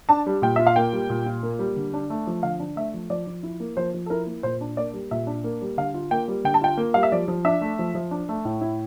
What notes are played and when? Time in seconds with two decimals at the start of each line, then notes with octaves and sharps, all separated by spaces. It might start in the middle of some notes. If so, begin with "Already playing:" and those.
0.09 D4 A5
0.26 G3
0.42 A#2 G5
0.56 F4 E5
0.67 F5
0.76 A#3 G5
0.93 G3
1.10 A#2
1.26 F4
1.43 A#3
1.59 G3
1.76 D3
1.94 D4
2.10 A3
2.27 F3
2.43 D3 F5
2.60 D4
2.76 A3 E5
2.94 F3
3.10 F3 D5
3.27 F3
3.43 E4
3.60 A#3
3.77 F3 C5
3.94 F3
4.06 A4
4.10 E4 A#4
4.27 A#3
4.43 A#2 C5
4.61 D4
4.77 A#3 D5
4.93 G3
5.11 A#2 E5
5.27 D4
5.44 A#3
5.62 G3
5.77 D3 F5
5.94 F4
6.11 A#3 G5
6.28 G3
6.44 D3 G5
6.54 A5
6.61 F4 G5
6.77 A#3
6.94 G3 F5
7.03 E5
7.12 F3 D5
7.28 F3
7.45 D4 E5
7.61 A3
7.79 F3
7.95 F3
8.11 D4
8.29 A3
8.45 A2
8.61 E4